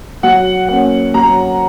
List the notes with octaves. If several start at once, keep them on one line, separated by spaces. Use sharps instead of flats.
F#3 F#5
A#3 C#4 F#5
F#3 A#5